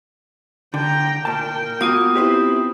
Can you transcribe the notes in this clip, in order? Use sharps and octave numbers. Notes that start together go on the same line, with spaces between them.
D3 G5 A#5
A#2 A#4 G5 A5
A#3 B3 F4 F#4 D#6
C4 E4 G4 B4 C5